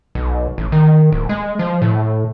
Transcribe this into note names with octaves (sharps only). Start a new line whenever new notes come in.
B1
A1
D#3
D1
G#3
F3
A2